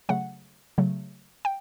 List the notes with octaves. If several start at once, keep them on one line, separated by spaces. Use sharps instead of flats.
C#3 F#3 A3 F#5
C#3 F#3 A3
G5